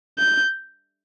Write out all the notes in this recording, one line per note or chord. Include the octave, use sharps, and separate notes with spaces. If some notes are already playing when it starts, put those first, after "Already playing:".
G6